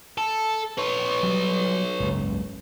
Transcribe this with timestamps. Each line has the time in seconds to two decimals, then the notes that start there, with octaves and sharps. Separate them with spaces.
0.18 A4
0.78 B4 C#5
1.23 F#3 G3
2.00 F#1 C#2 G#2